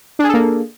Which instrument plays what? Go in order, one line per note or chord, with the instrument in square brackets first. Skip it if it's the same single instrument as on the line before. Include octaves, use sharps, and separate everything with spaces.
[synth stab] D4
G#4
A4
A#3